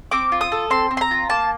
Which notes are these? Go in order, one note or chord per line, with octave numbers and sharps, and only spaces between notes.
C4 D6
F4
D#6
A4
C4 C6
C4
C6
A#5
F4
A#3 A5